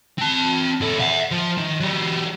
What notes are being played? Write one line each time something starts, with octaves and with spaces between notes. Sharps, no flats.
C4 A5
A#2 A4
E5 F#5
F3
D#3
F#3 G4